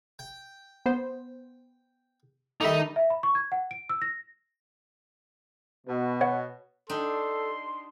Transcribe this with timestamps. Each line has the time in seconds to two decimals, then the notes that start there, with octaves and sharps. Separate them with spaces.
0.19 G5
0.86 B3 C5
2.61 D#3 G3 A3 D#4 D#5 E5 D6
2.96 E5
3.10 B5
3.23 C#6
3.35 G#6
3.52 F#5
3.71 D7
3.89 E6
4.02 A#6
5.87 B2
6.21 C#5 F#5
6.89 D4 D#4 G4 A4 C6